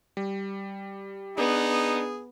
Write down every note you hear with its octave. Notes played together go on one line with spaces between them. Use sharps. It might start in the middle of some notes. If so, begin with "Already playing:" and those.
G3
B3 D4 D#4 G#4